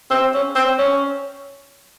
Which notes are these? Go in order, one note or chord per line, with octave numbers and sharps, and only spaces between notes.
C4
C#4
C4
C#4